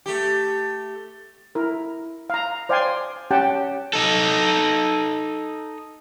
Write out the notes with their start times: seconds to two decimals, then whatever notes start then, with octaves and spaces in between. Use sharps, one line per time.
0.06 A3 G4
1.55 E4 A#4
2.30 F5 A#5
2.69 C5 D5 F5 G5 G#5 C6
3.31 C#4 G4 F#5 G5 A5
3.93 D#4 A4